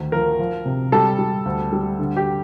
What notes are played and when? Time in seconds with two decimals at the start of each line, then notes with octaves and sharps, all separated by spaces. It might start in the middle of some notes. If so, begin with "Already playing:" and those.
Already playing: D2 D#3
0.12 F3 A#4
0.39 F3
0.65 C3
0.92 G3 A4
1.19 G3
1.46 D2
1.72 G3
1.99 D3
2.17 G4